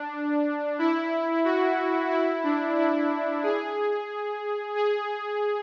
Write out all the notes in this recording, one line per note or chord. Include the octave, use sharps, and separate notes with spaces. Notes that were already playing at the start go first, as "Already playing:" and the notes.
Already playing: D4
E4
F#4
E4
D4
E4
G#4
G#4